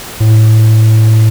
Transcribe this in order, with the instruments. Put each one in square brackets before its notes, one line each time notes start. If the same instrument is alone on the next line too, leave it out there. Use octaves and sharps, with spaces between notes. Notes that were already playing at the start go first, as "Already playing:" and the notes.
[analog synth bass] A2